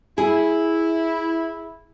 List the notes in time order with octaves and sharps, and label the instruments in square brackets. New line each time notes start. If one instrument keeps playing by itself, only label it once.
[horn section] E4 [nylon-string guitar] G#4